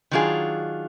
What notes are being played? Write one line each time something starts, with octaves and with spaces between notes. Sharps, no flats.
D#3 F#3 D4 F4 G#4